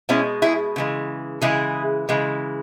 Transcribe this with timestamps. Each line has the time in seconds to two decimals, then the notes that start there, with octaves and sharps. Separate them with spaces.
0.09 B2 G#3 C#4 E4
0.42 E4 G#4
0.76 C#3 E3 G#3
1.42 C#3 E3 G#3 E4 G#4
2.09 C#3 E3 G#3